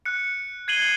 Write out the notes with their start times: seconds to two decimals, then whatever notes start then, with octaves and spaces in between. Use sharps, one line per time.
0.06 F#6 C#7
0.68 G#6 C7 D#7 F#7 G7